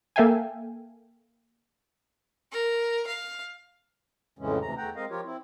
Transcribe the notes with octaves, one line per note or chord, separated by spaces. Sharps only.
A#3 A4 E5 F5 G5 G#5
A#4
F5
F2 A2 C#3 E3 G#3 C#4
D2 C3 E3 A#5
E2 E3 A3 F#5 G5 A#5
G#3 C4 A#4 D#5 F5
F3 F4 G4 A#4 C#5
C4 E4